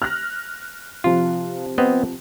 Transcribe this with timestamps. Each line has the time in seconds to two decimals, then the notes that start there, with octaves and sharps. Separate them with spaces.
0.02 F6 F#6 A#6
1.04 C3 F3 F4
1.78 B3 C4 D#5